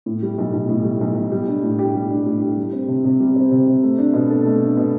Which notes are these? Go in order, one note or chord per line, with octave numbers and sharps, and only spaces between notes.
A2
G3
B1
B1
A2
G3
B1
B1
G3
D4
A2
G4
G3
D4
A2
G4
G3
C4
C3
C3
G3
C4
C3
C3
A3
D4
B2
A4
A3
D4
B2